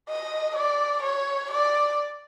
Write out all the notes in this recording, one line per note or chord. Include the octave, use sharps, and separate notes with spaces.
D#5
D5
C#5
D5